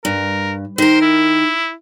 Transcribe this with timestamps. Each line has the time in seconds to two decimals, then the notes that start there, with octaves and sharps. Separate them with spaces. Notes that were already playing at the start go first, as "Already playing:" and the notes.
0.05 G2 A#4
0.78 D#3 A#4 C5
1.02 E4